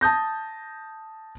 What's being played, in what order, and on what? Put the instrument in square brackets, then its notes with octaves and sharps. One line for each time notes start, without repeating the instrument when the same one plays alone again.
[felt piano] A5 D#6 G6 A#6